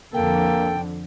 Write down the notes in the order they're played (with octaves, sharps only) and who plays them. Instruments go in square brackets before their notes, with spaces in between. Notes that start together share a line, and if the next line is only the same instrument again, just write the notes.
[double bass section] F2 D3 [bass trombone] A#3 [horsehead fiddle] A4 [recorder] G5